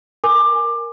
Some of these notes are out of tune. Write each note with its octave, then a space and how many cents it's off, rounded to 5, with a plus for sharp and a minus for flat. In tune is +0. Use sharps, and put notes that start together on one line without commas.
A#4 +0 G#5 +0 D6 +20